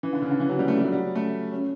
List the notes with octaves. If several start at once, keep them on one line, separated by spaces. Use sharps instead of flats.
E3
D3
C#3
D3
E3
F#3
G3
A3
G3
F#3
G3
A3
C#4